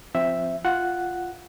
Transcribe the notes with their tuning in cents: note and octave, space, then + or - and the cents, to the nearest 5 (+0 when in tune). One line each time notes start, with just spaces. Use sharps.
F3 +0 C4 +0 E5 +0
F4 +0 F#5 +0